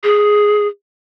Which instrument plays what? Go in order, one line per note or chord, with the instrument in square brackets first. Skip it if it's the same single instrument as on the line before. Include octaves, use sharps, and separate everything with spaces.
[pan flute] G#4